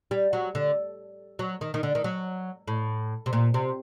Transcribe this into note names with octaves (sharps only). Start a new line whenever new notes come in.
G3
F#3
D3
F#3
D#3
D#3
D3
D#3
F#3
A2
C3
A#2
C3